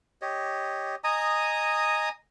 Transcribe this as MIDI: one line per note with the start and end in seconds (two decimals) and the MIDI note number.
0.22 0.96 67
0.22 0.96 73
0.22 0.96 75
1.04 2.09 75
1.04 2.09 80
1.04 2.09 82
1.04 2.09 87